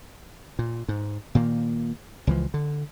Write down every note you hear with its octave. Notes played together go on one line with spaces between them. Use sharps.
A#2
G#2
A#2 D#3 A#3
C#2 E3 F3
D3